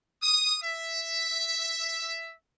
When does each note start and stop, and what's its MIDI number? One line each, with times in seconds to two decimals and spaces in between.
0.23 0.56 87
0.63 2.31 76